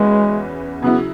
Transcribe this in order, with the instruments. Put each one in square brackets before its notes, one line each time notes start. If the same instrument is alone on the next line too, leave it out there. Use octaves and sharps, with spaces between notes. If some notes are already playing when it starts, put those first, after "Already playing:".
Already playing: [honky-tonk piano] E2 E3 C#4 F#4 B4 [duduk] G#3
[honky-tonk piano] C#3 F#3 E4 [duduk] B3